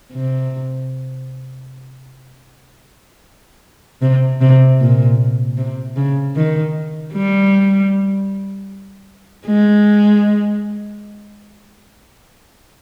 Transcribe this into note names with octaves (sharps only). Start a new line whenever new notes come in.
C3
C3
C3
A#2
C3
C#3
D#3
G3
G#3